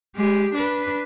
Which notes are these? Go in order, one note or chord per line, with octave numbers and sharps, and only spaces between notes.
G#3 G4
D4 B4